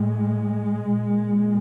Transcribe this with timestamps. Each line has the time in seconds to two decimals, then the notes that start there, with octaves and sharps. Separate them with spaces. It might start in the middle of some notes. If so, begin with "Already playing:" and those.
Already playing: A2 G#3
0.91 A#2